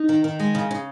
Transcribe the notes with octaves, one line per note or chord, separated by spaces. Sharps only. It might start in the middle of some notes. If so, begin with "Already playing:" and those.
Already playing: D#4
D#3
D#3
G#3
C#3
C#3